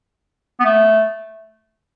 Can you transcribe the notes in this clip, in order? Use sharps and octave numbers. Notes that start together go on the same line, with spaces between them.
B3
A3